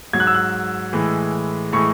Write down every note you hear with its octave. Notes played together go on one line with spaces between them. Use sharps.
G#2 F#3 G#6
F#6
E6
F#6
A2 E3 G#3
A2 E3 G#3 C#6